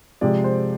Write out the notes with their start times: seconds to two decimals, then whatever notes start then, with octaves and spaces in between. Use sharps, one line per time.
0.21 C3 F3 G#3 D5
0.44 C5